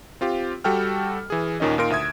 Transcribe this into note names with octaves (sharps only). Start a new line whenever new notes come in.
C4 F4 G4
G3 F#4 A4 G5 F6
E3 G#4
D#2 A#2 D#3 C#4 D#5
A#2 D#4 F4 A#4 C6 D7
D2 E5 D#6 G#6